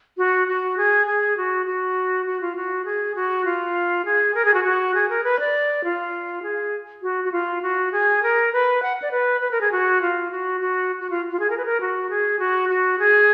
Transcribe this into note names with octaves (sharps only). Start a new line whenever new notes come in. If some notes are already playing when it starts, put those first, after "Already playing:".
F#4
F#4
G#4
G#4
F#4
F#4
F#4
F4
F#4
G#4
F#4
F4
G#4
A#4
G#4
F#4
F#4
G#4
A#4
B4
D5
F4
G#4
F#4
F#4
F4
F#4
G#4
A#4
B4
F#5
D5
B4
B4
A#4
G#4
F#4
F4
F#4
F#4
F#4
F4
F4
G#4
A#4
B4
A#4
F#4
G#4
F#4
F#4
G#4